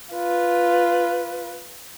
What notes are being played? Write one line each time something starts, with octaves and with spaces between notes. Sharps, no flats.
F4 B4